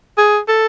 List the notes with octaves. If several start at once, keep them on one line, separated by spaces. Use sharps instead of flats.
G#4
A4